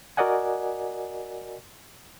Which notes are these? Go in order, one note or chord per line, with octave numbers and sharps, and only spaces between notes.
F#4 A#4 D5 D#5 F#5 G#5